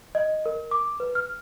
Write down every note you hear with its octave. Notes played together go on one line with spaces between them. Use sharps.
D#5
A#4
D6
B4
F6